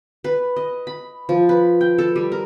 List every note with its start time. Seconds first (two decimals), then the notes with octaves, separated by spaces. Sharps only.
0.24 B4
0.56 D#5
0.87 B5
1.29 F3
1.49 B4
1.81 G5
1.99 A4
2.16 G3
2.32 A#4